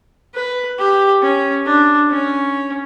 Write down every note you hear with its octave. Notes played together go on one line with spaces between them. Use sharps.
B4
G4
C#4
D4
C#4